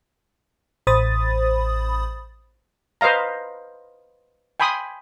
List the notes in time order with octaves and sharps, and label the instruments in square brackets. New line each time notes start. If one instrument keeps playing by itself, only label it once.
[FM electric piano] A1 C5 B5 D#6 A6
[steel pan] B4 C5 D#5 F5 A#5
G5 G#5 B5 C6 D#6